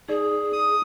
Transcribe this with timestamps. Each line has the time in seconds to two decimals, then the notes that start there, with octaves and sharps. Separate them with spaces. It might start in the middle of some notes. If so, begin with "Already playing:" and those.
0.08 D#4 G#4 D5
0.53 D#6